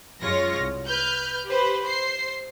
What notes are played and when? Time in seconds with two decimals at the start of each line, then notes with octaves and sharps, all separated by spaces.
0.21 F#2 G#3 F4 C#5 A#6
0.56 C2
0.86 B4 F6 G6
1.45 G4 B4 C5
1.83 C5 C7